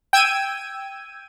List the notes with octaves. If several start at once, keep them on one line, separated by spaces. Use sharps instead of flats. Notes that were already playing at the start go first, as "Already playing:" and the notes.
G5 E6 G#6 D#7